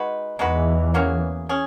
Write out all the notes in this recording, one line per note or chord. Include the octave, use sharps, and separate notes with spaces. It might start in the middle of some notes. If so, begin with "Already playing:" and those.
Already playing: G#3 D#4 F#4 B4
E2 E3 G#3 D#4 F#4 B4
F#3 A#3 C#4 G#4
C#4 G#4